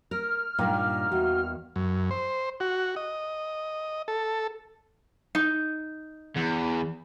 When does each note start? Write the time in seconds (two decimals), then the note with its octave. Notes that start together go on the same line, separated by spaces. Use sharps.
0.11 A#4 F6
0.59 G2 A#2 D#3 A#3
1.12 E2 F#4
1.76 F#2
2.11 C5
2.60 F#4
2.96 D#5
4.08 A4
5.35 D#4
6.36 E2